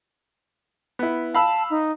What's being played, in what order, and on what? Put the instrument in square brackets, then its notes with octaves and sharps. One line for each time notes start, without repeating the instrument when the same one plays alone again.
[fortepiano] B3 E4
[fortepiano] F5 B5 E6 [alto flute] A5
[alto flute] D#4